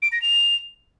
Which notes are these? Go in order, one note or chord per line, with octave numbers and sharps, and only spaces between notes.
D7
A#6
F7